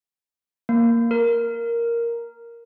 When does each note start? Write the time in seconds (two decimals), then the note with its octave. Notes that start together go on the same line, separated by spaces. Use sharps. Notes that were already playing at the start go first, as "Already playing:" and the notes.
0.69 A#3
1.11 A#4